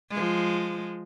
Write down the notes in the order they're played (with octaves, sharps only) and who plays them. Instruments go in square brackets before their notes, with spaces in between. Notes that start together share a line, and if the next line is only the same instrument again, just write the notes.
[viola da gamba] F3 G#3